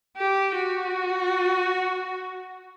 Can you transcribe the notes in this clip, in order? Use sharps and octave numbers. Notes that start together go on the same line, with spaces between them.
G4
F#4